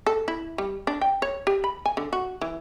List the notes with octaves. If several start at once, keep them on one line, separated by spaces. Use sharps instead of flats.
A4
E4
G3
D4
G5
C#5
G4
B5
G#5
D3
F#4
E3